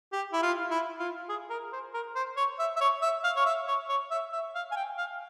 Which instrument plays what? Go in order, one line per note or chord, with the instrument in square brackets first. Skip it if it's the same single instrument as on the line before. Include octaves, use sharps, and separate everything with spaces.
[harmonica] G4
E4
F4
E4
F4
G#4
A#4
C5
A#4
C5
C#5
E5
E5
C#5
E5
F5
C#5
E5
C#5
C#5
E5
E5
F5
G#5
G5
F5